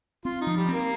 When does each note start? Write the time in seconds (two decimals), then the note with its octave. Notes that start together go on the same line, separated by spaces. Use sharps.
0.25 C4 F4
0.41 D#4
0.47 F3
0.57 G3
0.68 A#3 C4